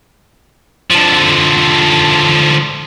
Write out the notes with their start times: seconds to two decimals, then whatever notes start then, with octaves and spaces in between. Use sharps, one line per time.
0.90 D3 F3